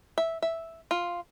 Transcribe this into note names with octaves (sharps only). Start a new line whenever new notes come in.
E5
E5
F4